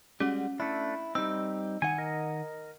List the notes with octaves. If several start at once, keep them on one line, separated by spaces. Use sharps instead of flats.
G3 G#3 C#4 F#4
A3 D4 E4
G3 C4 D#4 E6
D#3 D#4 F#5 G#5
A#4 D#5